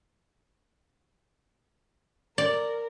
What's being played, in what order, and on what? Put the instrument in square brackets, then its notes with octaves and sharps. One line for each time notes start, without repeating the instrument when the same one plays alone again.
[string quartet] A#4 [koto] D5